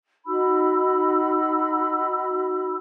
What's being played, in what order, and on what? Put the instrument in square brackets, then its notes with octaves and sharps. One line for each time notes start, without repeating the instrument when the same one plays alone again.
[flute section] D#4 F#4 B5 E6